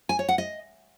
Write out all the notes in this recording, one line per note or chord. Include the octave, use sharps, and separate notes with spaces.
G#5
C#5
F#5
D#5